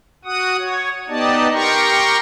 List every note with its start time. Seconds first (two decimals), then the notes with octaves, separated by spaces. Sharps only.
0.25 F#4 F#5 D#6
0.59 C#5
1.08 B3 D#4 G4 D5 D#5 A5
1.54 G4 A#4 G5 A#5 C6 C#6